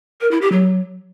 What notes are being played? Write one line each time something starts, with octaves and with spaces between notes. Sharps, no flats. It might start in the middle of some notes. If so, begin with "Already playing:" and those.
A#4
E4
G4
F#3